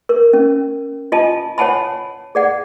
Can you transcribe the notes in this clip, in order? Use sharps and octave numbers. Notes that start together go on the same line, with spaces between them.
A#4
C#4
F4 D#5 G#5 A5
C#5 F#5 G#5 A5 B5
G#4 D5 F#5